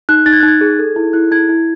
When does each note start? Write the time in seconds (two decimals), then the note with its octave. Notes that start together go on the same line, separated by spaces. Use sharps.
0.09 D#4 F#6
0.26 D#4 A6
0.33 G#6
0.40 D#4 F#6
0.48 G#6
0.61 G#4
0.79 A4
0.96 E4
1.13 E4 F#6
1.31 E4 G#6
1.49 E4